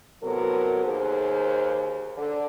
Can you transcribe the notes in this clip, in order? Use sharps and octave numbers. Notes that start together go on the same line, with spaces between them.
A2 C3 F#3 B3 A4 A#4
D#2 G#4 C5
D3